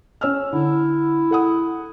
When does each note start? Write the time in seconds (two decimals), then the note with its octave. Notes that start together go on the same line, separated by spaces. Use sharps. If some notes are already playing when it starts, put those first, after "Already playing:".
0.21 C#4 E6 F6
0.53 D3 E4
1.31 A4 F#5 D#6